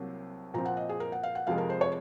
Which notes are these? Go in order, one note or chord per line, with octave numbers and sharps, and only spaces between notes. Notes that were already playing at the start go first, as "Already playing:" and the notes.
Already playing: C2 C3 F#3 A#3
A#2 F3 C4 A#5
F#5
D#5
G#4
A#4
F#5
F5
F#5
F2 C3 F3 G#3 F5
A#4
C5
C#5